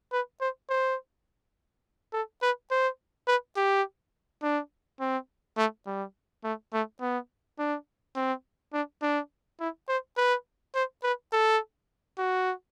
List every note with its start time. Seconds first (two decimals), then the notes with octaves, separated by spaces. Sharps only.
0.12 B4
0.41 C5
0.70 C5
2.13 A4
2.42 B4
2.71 C5
3.27 B4
3.56 G4
4.42 D4
5.00 C4
5.57 A3
5.87 G3
6.44 A3
6.73 A3
7.01 B3
7.59 D4
8.16 C4
8.73 D4
9.02 D4
9.60 E4
9.89 C5
10.17 B4
10.75 C5
11.04 B4
11.32 A4
12.18 F#4